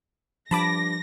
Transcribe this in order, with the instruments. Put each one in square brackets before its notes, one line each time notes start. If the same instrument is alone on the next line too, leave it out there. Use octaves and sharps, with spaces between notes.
[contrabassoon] G2 [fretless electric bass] F3 [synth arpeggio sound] A5 B5 D6 [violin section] A#6